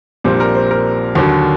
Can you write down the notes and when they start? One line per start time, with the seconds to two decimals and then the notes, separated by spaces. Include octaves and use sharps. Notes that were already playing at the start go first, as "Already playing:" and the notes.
0.24 A#1 A#2 G3 C4 C5
0.40 A#4
0.55 C5
0.71 A#4
1.15 D#2 D3 F#3